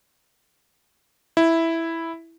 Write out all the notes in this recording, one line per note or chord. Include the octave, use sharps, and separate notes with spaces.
E4